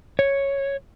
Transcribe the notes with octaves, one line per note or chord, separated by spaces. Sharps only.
C#5